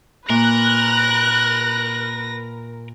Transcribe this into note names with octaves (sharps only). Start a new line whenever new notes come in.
A#2 A#4 B4 F#6 A#6